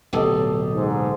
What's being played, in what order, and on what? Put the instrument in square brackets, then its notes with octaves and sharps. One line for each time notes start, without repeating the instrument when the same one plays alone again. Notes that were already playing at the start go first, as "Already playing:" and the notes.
[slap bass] D1 B1 [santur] G4 A4 D#5
[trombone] G#2